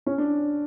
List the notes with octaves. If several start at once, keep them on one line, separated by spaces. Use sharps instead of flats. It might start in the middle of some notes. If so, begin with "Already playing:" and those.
C#4
D4